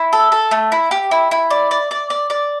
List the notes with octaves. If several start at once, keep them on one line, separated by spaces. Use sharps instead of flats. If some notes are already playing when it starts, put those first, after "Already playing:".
Already playing: E4
A4
A4
A3
E4
G4
E4
E4
D5
D5
D5
D5
D5